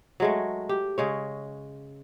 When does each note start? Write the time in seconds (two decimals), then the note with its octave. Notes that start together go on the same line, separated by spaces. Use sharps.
0.20 F#3 G#3 A3
0.69 G4
0.98 C#3 G#3 C#5